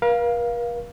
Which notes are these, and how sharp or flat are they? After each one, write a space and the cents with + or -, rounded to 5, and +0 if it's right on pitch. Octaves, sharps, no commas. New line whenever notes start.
A#4 +45 F5 +0